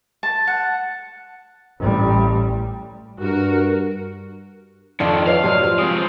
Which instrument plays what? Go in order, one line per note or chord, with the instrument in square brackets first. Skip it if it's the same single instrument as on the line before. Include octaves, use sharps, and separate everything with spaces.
[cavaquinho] A5
F#5
[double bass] A1 G3
[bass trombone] G2 [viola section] F#4 A#4
[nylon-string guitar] F2 F4 [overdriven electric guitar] D#3 D4 [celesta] D5
[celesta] B4 C#5 D#5 [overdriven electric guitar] F5
[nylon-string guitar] C3 F#3 [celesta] G4 D5 F6
[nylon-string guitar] F3
[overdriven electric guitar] G#3 C4 [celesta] D#6